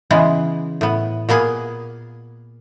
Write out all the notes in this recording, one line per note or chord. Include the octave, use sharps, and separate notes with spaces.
C#3 E3 G#3 B3
A2 B3
A#2 A#3 B3 G#4